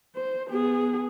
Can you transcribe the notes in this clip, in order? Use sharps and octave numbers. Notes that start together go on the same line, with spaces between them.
C5
B3 G#4